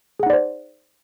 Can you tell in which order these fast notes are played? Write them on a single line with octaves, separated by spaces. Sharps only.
G#4 F#5 D#4 D5 C5